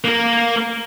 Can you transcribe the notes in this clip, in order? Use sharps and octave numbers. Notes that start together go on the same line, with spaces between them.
A#3 A#4